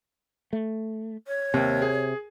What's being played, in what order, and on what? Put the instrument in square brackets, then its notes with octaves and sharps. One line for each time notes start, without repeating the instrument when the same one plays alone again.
[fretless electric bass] A3
[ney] C#5
[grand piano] D#2 [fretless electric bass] C3
[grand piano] G#4